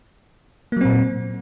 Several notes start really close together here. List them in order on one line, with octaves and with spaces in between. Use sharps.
A#3 F#3 C4 A#2